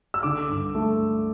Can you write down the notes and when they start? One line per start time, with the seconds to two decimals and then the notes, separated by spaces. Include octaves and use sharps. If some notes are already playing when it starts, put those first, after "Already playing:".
0.14 E6
0.23 D3 D6
0.49 G2
0.75 A3